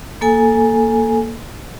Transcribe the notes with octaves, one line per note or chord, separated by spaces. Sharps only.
A#3 A4 G#5